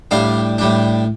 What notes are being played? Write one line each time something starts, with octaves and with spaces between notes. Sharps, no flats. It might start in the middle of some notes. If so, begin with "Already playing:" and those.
A2 G3 D4 F5
A2 G3 D4